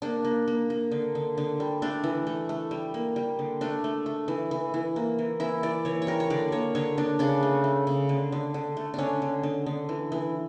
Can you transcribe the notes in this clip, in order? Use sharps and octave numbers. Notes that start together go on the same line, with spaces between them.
A#3 D4
A#3
A#3
A#3
D3
D3
D3
G3
A3 D4
E3
A3
A3
G3
A#3
G3
D3
A3 D4
A3
A3
E3
E3
E3
A#3
E3
E3 E4
E3 D5
E3 C#5
C#5
G3 A#4
C#5
D3 D5
A#3 C#5
D3 C#5
D3 D4
C#3 D4
A3
A3
C#3
D3
D3
D3
A3
D3 C#4 D4
D3
D3
D3
E3
E3